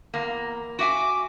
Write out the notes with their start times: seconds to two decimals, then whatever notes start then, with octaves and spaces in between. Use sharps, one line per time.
0.14 E2 A#3
0.79 F#4 E5 G#5 D6